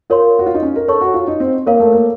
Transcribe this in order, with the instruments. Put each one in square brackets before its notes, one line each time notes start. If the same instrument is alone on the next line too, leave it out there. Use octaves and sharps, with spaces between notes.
[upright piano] F4 [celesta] A#4 C#5 F5 C6
[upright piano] F#4
F4
D#4
C#4
A#4
[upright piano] A4 [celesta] C#5 A5 C#6
[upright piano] F#4
F4
D#4
C4
[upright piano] A#3 [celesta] A#4 C#5 F5
[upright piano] A3
A#3